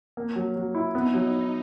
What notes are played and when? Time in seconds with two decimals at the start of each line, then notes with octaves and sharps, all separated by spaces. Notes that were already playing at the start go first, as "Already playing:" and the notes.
0.17 A#3
0.36 F#3
0.56 F#3
0.75 E4
0.94 B3 D#4
1.14 F#3